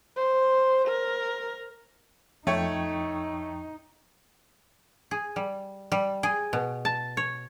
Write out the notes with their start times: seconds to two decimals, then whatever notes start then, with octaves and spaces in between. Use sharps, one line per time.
0.17 C5
0.88 A#4
2.47 F2 A3 D#4 C#5 G5 C#6
5.11 G#4
5.36 G3
5.92 G3
6.23 G#4
6.53 B2
6.85 A5
7.17 C#5